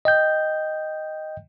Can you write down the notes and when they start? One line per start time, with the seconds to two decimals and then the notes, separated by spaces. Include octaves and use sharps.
0.05 D#5 G5 G6